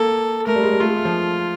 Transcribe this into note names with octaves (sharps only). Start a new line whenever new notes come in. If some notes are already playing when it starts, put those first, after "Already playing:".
Already playing: A#3 A4
A3 A#4
G3
G#3
G3
A3 F4
G#3
A3
F3